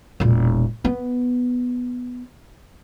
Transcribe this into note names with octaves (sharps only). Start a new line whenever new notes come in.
E1 A#2
B3